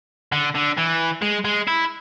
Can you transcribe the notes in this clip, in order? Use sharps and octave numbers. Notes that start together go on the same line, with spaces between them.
D3
D3
E3
G#3
G#3
E4